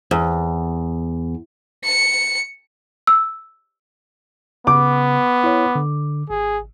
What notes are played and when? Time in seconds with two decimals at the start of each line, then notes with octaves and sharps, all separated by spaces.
0.11 E2
1.84 C#7
3.07 E6
4.67 C#3 B3 D6
5.44 E4 C#5
5.75 D3
6.30 G#1 G#4